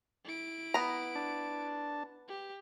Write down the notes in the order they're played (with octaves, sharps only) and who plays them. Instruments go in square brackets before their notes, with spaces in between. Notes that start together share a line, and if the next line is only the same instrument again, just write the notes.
[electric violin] E4 D7
[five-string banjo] B3 A#5
[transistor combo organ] D4 A5
[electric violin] G4